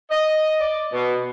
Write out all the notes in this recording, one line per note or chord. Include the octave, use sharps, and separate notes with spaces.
D#5
D5
B2